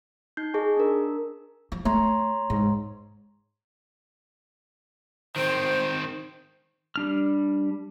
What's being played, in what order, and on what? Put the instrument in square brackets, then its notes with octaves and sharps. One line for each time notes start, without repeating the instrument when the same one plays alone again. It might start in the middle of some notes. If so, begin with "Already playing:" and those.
[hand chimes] D#4 G6 C7
G#4 D#5 A5 C#6
D4 A#4
[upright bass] F3
[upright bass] A3 [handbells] C#5 A#5 C6
[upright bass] G#2
[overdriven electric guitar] D#3 C4 [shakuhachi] C5
[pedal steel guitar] G3 D4 F6